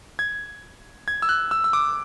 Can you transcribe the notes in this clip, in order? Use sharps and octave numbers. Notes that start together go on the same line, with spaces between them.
G#6
G#6
E6
F#6
E6
E6
D6